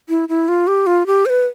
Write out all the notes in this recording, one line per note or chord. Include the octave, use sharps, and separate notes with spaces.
E4
E4
F4
G4
F4
G4
C5
B4